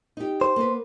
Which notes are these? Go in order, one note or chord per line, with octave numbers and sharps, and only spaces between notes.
D#4 G4
C5
A#3 B3 B4